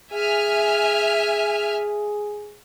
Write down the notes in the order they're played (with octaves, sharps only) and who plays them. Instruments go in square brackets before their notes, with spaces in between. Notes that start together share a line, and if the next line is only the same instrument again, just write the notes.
[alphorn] G#4 [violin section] E5 G#5 F6